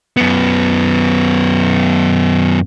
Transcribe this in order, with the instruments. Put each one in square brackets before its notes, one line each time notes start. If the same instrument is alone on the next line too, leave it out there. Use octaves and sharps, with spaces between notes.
[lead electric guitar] F#2 B3